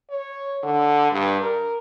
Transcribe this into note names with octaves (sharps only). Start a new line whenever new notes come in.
C#5
D3
G2
A#4